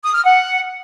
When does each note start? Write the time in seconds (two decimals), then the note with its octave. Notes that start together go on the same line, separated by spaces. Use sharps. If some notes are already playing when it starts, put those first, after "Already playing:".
0.03 D#6
0.14 F6
0.24 F#5